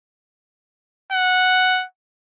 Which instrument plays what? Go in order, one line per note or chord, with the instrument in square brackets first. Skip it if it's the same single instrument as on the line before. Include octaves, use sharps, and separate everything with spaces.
[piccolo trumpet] F#5